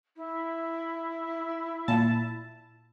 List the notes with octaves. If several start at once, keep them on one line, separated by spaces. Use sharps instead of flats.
E4
A#2 A5